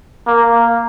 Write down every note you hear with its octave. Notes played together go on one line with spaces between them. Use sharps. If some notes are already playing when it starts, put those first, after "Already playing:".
A#3